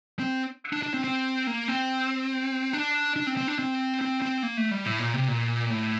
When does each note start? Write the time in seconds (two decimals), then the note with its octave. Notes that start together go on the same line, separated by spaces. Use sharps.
0.19 C4
0.73 D4
0.83 D4
0.94 C4
1.04 C4
1.47 A#3
1.68 C4
2.73 D4
3.16 D4
3.27 C4
3.37 C4
3.48 D4
3.59 C4
4.01 C4
4.22 C4
4.43 A#3
4.57 A3
4.71 G3
4.86 A2
5.00 A#2
5.14 C3
5.28 A#2
5.70 A2